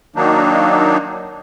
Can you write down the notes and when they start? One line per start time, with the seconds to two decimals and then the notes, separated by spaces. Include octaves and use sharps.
0.16 D#3 F#3 A#3 D4 D#4